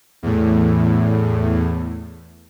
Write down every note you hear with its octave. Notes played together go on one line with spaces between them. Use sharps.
E2 A2